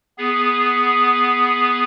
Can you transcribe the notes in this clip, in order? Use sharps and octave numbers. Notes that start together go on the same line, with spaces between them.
B3 G#4